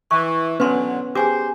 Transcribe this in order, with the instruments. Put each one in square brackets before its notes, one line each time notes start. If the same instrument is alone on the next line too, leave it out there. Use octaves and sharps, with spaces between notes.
[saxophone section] E3 [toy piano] C#6
[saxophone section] A2 D3 F#3 [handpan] B3 C#4 [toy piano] B4 C6
[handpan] G4 [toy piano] G#4 G#5 D6 [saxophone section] C5